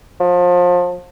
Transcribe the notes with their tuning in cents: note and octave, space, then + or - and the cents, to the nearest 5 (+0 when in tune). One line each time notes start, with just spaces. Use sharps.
F3 +30